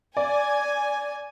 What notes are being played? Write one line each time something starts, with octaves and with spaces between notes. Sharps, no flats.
D5 G#5